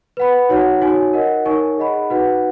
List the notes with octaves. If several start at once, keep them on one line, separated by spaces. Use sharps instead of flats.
B4 F#5 B5
D#4 F#4 C#5 F#5
D#4 F#4 C#5 G#5
A#4 D#5 F#5
D#4 A#4 C#5 G#5 C#6
G#4 D#5 F#5 B5
D#4 F#4 B4 F#5